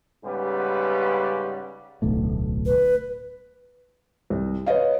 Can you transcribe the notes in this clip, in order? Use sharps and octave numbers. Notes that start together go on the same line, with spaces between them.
G#2 C#3 G3 B3 G4 B4
D1 B1 A3
B4
C2
B4 C#5 D#5 F5